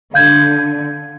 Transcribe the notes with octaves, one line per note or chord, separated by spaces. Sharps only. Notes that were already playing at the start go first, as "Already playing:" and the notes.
D3 F5 G6 G#6